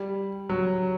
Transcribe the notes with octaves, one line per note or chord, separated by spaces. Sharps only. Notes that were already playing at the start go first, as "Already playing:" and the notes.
Already playing: G3
F#3